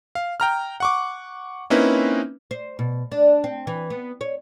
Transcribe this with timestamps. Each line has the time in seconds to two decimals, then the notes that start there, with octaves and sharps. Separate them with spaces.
0.15 F5
0.40 G5 A#5 F6
0.80 F#5 C#6 D6
1.70 A#3 C4 C#4 D#4 E4 B4
2.51 C5
2.79 B2
3.12 D4
3.44 C4
3.67 E3
3.90 B3
4.21 C#5